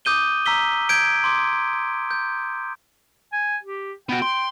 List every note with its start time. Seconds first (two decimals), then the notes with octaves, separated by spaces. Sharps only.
0.05 D6 D#6 G6 D#7 G7
0.46 A#5 E6 B6 G7
0.89 G6 G#6 D7
1.24 C6 D6
2.11 G6
3.33 G#5
3.63 G4
4.09 B3 F#4 G5
4.22 C6